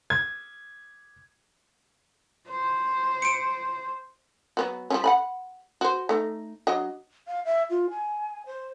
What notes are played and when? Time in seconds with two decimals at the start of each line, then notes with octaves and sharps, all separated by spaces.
0.10 G#6
2.49 C5
3.22 C#7 D7
4.57 F#3 B3 F#4
4.90 F3 G3 C#4
5.04 F#5 G#5 B5
5.81 F#4 C5
6.09 A3 D#4
6.67 F#3 D4 D#5
7.27 F5
7.45 E5
7.70 F4
7.90 G#5
8.47 C5